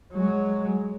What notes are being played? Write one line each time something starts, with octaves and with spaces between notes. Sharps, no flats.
F#3 G#3